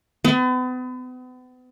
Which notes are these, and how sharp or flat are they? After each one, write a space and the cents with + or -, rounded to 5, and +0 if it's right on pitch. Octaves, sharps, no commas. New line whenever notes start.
B3 +40